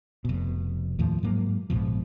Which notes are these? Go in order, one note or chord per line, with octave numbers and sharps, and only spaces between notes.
F1 B2
D#2 A2 F3
G#2 F#3 A#3
A#1 G#2 B2 F3